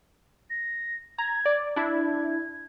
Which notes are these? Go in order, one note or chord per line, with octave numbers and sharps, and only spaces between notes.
A#6
A#5 G#6
D5
D4 E4 G#6